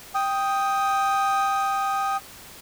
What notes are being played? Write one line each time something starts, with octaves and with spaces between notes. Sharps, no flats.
G5 D#6